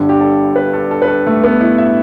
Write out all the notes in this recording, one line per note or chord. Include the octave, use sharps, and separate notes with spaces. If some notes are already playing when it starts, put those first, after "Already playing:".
Already playing: G1 G2 D3 G3
G4
A4
B4
A4
A4
B4
A4
A3
B3
E4
E5